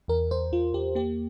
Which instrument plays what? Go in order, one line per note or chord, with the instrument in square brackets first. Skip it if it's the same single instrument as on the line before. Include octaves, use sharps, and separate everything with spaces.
[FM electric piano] E2 A#4
E2 C5
E2 F4
E2 G4
A#3 G4